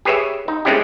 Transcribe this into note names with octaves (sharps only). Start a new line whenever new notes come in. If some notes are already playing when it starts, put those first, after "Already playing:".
G4 G#4 B4 C#5 E5
D#4
G#3 A3 C4 C#4 E4 G4